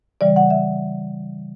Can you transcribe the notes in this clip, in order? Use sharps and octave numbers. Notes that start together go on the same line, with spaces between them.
C#3 E3 G3 D5
F#5
E5